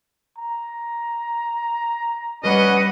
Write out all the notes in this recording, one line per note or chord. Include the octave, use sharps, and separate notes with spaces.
A#5
G3 C#4 B4 D#5 F#5